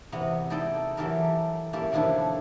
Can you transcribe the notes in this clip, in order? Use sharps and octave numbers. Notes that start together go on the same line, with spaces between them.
E2 C3 B3 A#5
D#4 E4 A4 D5 D#5 G5
E3 F#3 G4 A4 A#4
A#3 C#4 E4 G4 A4
C3 D#3 F3 D4 E4 A4